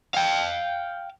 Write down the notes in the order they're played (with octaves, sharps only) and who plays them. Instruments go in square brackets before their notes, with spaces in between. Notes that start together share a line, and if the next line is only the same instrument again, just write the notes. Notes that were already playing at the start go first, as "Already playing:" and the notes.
[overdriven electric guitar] F5 G5